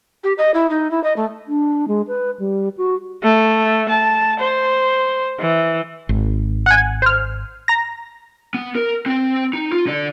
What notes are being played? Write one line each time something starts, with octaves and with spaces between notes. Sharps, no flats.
G4
D#5
E4
D#4
E4
D#5
A3
D4
G#3
B4
G3
F#4
A3
A5
C5
E3
G#1
F#5 G#5
C5 F6
A#5 A#6
B3
A#4
C4 G5
D#4
F4
D3 D5